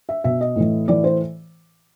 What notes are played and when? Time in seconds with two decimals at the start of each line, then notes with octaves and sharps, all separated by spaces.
0.09 E5
0.24 B2 E5
0.41 D#5
0.56 A2 E3
0.88 A2 E3 D5
1.04 C5